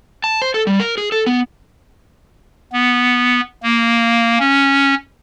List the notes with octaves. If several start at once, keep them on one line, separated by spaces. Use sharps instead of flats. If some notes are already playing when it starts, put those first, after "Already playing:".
A5
C5
A4
G3
A#4
G#4
A4
B3
B3
A#3
C#4